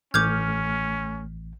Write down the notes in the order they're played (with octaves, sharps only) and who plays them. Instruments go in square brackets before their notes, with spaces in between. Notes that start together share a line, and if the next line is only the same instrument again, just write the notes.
[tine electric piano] A1 [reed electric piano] A3 F6 [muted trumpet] C#4 [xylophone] D6 G6 G#6